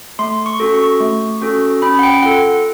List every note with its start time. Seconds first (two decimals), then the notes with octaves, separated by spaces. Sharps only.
0.19 A3 C6
0.46 C#6
0.60 C#4 F#4 A4
0.74 C#6
1.01 A3
1.41 C#4 F#4 A4
1.82 C#4 B5
1.99 F#5
2.03 G5
2.23 F4 A4 F#5